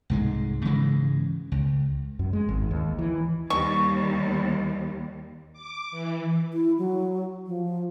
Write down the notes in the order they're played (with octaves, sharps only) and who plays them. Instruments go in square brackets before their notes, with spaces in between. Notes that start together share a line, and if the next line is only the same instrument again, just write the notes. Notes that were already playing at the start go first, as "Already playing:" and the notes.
[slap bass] C2 G#2 G#3
G#2 C#3 E3 G#3
C#2
[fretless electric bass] F#2
G#3
G#1
D#2
E3
[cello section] D#2 G3 [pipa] C#6
[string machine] D6
E3
[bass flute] E4
F#3
F3